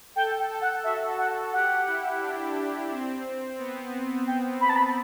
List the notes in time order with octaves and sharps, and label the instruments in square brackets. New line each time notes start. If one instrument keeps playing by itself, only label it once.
[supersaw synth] A4 [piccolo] G5
[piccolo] G5
[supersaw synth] A4
[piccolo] F#5
[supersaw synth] F#4 [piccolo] E5
[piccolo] F#5
[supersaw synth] G4 [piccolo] F#5
[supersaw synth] E4
D4
C4
B3
[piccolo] G5
B5
A5
B5